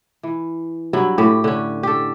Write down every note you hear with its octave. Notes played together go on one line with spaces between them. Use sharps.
E3
G2 F#3 E4
A2 G4
D3 C#4
G4 A4